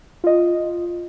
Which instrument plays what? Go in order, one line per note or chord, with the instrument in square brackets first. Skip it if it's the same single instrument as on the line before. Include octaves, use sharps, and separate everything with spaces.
[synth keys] F4 D#5